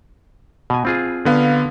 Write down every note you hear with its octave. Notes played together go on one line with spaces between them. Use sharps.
B2 G#5
C4 F4 G#4
D3 B3 F5